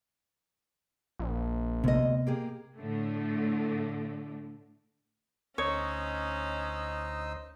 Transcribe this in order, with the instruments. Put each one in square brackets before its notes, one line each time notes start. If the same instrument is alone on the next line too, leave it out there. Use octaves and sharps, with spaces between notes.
[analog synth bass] A#1
[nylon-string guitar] D2 D#5 [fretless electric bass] C3 B3
[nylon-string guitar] A#3 G4 G#4
[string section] A2 D3 A3
[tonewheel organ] D2 C5 [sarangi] C#4 [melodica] D#4 D#5 E6 [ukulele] C#5